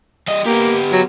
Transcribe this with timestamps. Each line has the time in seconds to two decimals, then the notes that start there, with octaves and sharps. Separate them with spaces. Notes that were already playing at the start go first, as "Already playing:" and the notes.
0.28 G3 D#5
0.46 A#3 B3 G4
0.92 F#3